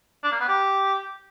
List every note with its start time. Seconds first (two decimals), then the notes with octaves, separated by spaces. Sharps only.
0.23 D4
0.32 A#3
0.40 B3
0.48 G4